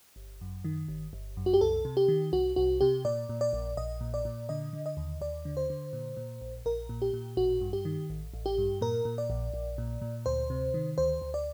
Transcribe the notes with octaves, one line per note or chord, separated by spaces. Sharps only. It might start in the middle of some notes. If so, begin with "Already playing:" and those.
G1
F#2
D#3
G1
G1
F#2
F#4
G4
C2 A4
C3
G4
D#3
C2 F#4
C2 F#4
C3 G4
A#2 D5
A#2
D5
A#1
A#1 D#5
A#2
D5
A#2
D3 D#5
D3
D#5
D#2
D#2 D5
D3
C5
D3
A#2
A#2
A#1
A#1 A#4
A#2
G4
A#2
A1 F#4
G2
G4
D#3
A1
A1
G4
G2
A#2 A#4
A#2
D5
A#1
A#1
A#2
A#2
D2 C5
C3
D#3
D2 C5
D2
D5